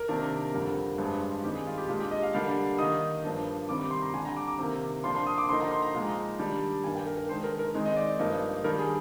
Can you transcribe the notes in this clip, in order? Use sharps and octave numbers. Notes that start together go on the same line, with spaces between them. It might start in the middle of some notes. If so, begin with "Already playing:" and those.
Already playing: A#4
C3 D#3 A#3 D4
F2 D3 G3 A#3
G2 F3 G#3 D4
F4
D#3 G3 C4 D#4 G4
G#4
F4
G4
A#2 G#3 D4 F4
G4
D#5
F5
D3 G3 A#3 D4 F5
D#3 A#3 D#4 D#6
G2 F3 A#3 D4
C3 D#3 G3 C4 D6
D6
C6
A#5
D3 G3 D4 G#5
A#5
D6
D6
C3 D#3 A#3
A#2 F3 A#3 D4 C6
C6
D#6
D6
D3 F3 A#3 D#4 C6
A#5
C6
A#5
A#2 F3 G#3 D#4
D#3 G3 D4
G2 D#3 A#3 D4 G#5
G5
A#4
A#4
D#3 G#3 D4 C5
A#4
A#4
D#3 G#3 C4 D#4
D#5
D5
G2 F3 A#3 D#4
D#3 G3 D4 A#4
G#4